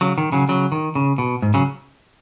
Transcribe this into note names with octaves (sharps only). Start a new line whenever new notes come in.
C#3 F#3
D#3
C#3 F#3
C#3 F#3
D#3
C#3
B2
G#2
C#3 F#3